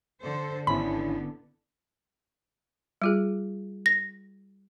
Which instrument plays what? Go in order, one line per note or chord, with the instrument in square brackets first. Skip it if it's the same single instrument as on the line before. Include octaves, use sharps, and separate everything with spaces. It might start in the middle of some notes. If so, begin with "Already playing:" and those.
[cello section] D3 A4 C5
[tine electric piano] G#1 C#4 E4 [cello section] D3 B3 [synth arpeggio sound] B5
[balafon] G3 F4 G#4
[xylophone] A#6